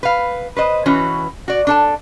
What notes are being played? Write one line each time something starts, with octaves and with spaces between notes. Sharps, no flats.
B4 F5
B4 C5 D#5
E3 C#4 F#4 B4
F#4 D5
D4 A4 A5